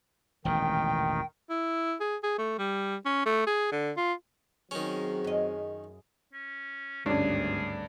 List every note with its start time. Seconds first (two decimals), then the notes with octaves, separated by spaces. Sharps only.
0.45 E1 A1 A#2 D#3 G5
1.50 E4
2.01 G#4
2.23 G#4
2.38 A3
2.58 G3
3.06 C#4
3.26 A3
3.47 G#4
3.72 D3
3.97 F4
4.71 D#3 F#3 G#3 C4 C#4
5.24 F#2 D#5
6.33 C#4
7.06 G#1 D2 G2 C#4 D4 G#4